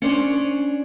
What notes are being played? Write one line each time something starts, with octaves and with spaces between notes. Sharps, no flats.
C#4 D4 C5 C#5